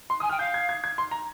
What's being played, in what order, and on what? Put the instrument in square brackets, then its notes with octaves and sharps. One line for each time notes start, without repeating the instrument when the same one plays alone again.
[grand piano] C6
[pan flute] G#5 [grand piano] D#6
[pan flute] G5 [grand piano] F6
[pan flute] F5 [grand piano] G6
[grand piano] G#6
G#6
G#6
C6
A#5